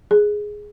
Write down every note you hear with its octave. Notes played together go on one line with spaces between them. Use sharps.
G#4